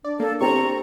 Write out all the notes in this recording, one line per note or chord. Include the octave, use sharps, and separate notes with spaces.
D4 D5
A#3 A4
C4 G4 A#5 C#6